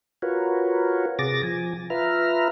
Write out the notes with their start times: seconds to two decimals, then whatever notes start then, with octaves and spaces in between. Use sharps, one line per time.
0.22 F4 F#4 A#4 B4 C#5
1.19 C3 G#4 D6 A6 A#6
1.43 F3 G#5
1.90 F4 B4 E5 A#5 F6